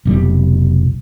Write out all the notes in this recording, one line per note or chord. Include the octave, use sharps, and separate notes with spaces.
F1 B1 G3